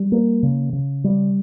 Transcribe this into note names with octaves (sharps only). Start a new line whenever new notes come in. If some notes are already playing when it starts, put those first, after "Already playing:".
Already playing: G3
A#3
C#3
C#3
G3